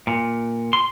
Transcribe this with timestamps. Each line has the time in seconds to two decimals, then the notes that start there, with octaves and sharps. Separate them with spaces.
0.07 A#2
0.73 C6